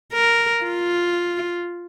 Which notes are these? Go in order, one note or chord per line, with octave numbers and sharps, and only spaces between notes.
A#4
F4